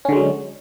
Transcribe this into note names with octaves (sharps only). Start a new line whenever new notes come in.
D3 F#3 G#3 C#4